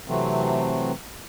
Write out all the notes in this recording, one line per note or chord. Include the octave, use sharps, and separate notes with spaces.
C3 E3 F#3 A3 C4